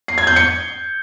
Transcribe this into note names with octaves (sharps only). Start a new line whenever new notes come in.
C7
G#6
G6
C#7